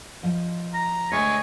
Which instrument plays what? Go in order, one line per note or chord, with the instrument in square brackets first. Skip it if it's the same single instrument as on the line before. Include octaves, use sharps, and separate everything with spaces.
[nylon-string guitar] F3 D#5
[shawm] A#5
[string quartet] D2 G#3 [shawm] C#5 [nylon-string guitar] E5